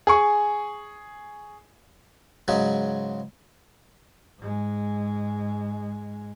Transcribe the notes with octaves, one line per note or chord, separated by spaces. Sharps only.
G#4 G#5 C#6
G#2 C#3 F#3 G#3
G#2 G#3